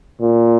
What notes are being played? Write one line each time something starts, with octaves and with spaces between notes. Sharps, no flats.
A#2